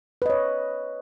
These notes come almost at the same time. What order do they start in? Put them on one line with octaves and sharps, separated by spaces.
B4 D#5 C#5